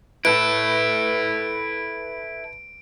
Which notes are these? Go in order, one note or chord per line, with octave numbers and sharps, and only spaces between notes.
E4 A4 B4 D7